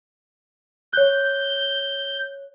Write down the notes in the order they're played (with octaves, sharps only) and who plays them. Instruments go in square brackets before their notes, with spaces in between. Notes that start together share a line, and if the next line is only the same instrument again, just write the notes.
[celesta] C#5 F#6 [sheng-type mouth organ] G6